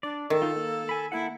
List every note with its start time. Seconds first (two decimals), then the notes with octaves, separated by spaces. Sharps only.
0.03 D4 D5
0.30 D#3 A4
0.42 D#4 F4
0.56 A#3
0.89 G#5 B5
1.12 A#3 E4 A4 F#5